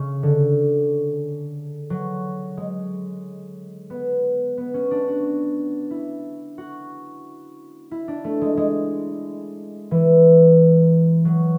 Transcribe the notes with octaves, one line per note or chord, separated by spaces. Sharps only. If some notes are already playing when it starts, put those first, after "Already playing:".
Already playing: C#3
D3
F#3
G#3
B3
B3
C#4
D4
F#4
E4
F#4
E4
D4
A3
G#3
G#3
E3
F#3